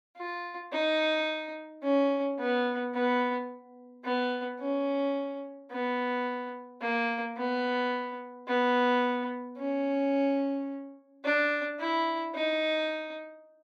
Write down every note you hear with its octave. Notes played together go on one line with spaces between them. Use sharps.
F4
D#4
C#4
B3
B3
B3
C#4
B3
A#3
B3
B3
C#4
D4
E4
D#4